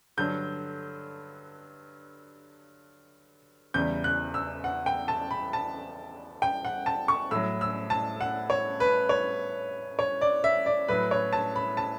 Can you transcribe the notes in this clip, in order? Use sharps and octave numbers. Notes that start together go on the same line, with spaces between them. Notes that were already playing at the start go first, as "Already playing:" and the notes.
G2 D3 F#3 G6
E2 C#3 G3 G6
F#6
E6
F#5
G5
A5
B5
A5
G5
F#5
A5
C#6
A2 F#3 E6
E6
A5
F#5
C#5
B4
C#5
C#5
D5
E5
D5
A2 F#3 B4
C#5
A5
B5
A5